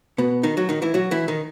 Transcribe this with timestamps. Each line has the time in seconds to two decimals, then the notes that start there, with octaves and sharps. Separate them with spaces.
0.18 B2 B3
0.43 D#3 D#4
0.57 F#3 F#4
0.69 D#3 D#4
0.82 E3 E4
0.94 F#3 F#4
1.11 E3 E4
1.28 D#3 D#4